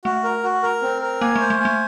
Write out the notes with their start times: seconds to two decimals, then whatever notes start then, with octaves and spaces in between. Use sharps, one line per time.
0.05 A3 F#4
0.24 A#4
0.43 F#4
0.63 A#4
0.82 C4
1.02 A#4
1.21 A#3 G#5
1.36 A3 C5
1.50 A3
1.60 G#5
1.65 A3